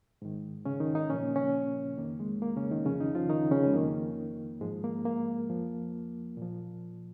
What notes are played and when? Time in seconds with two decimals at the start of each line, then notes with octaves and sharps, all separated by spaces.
0.22 G#2 D#3
0.65 C#3 C#4
0.80 D#3 D#4
0.95 D#3 D#4
1.10 A#2 F3 C#4
1.23 A#3
1.35 C#3 C#4
1.98 F2 D#3 A#3
2.20 G#3
2.42 A#3
2.56 C#3 C#4
2.71 D#3 D#4
2.85 F2 C#3 F3 C#4
3.00 D#3 D#4
3.15 F3 F4
3.29 D#3 D#4
3.51 C#3 C#4
3.67 G#3
3.73 F2 D#3 A#3
4.61 G#2 F3 G#3
4.84 A#3
5.05 A#3
5.50 F2 F3
6.37 A#2 F3